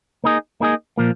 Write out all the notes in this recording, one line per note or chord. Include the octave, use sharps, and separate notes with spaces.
A#3 D#4 G#4 D#5
A#3 D#4 G#4 D#5
A#2 F3 A#3 F4